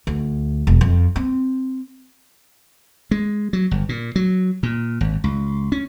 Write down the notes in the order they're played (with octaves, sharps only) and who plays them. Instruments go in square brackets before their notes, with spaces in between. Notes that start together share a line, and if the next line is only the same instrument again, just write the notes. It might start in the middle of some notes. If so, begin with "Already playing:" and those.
[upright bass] D2
E1
F2
C4
[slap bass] G#3
F#3
G1
A#2
F#3
A#2
G#1
C#2
C#4